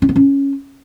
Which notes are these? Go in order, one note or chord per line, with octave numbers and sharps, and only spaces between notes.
C#4
B3
C#4